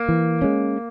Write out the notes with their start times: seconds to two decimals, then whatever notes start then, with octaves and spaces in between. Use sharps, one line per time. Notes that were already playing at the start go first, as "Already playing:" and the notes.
Already playing: A#3
0.09 E3
0.42 G#3 C#4